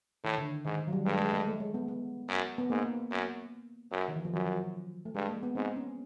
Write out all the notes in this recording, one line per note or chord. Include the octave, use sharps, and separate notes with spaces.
A2 D#3
D3
G#2 D#3
D#3
F#3
G3
G2 G#3
G#3
A3
A3
G#3
B3
B3
F#2
B3
G#2 A#3
F#2
F#2
D#3
E3
F3
F#2 F#3
A3
G2 G#3
A#3
B3
G#2 C4
C#4